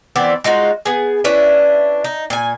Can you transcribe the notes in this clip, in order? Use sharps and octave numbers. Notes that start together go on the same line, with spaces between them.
E3 B3 C4 D5
G#3 D#4 F4 F#4
B3 G#4
C#4 D4 E4 B4
D#4
A#2 G#5